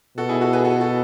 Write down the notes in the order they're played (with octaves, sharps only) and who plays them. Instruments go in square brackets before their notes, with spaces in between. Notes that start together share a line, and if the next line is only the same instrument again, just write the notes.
[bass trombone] B2 [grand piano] F#4 A4
[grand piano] E4 G#4
F#4 A4
G#4 B4
F#4 A4
F#4 A4